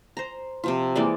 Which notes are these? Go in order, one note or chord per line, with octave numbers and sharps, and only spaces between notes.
C5 A#5
C3 F3 F4
E3 G#3 A#3 D5